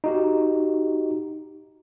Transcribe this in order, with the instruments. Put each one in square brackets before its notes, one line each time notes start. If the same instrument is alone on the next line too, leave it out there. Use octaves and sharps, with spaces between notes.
[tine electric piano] D#4 F#4 G4